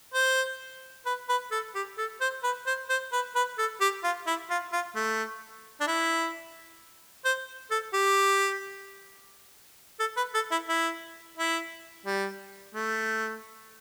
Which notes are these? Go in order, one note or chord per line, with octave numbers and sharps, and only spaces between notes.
C5
B4
B4
A4
G4
A4
C5
B4
C5
C5
B4
B4
A4
G4
F4
E4
F4
F4
A3
D4
E4
C5
A4
G4
A4
B4
A4
E4
E4
E4
G3
A3